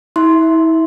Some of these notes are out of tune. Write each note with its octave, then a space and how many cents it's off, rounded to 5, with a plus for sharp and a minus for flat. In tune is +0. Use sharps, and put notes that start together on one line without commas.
E4 -35 E5 +0 C6 +0